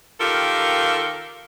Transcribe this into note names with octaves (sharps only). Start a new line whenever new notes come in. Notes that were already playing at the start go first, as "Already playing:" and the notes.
D#3 F4 G4 A4 A#4 F5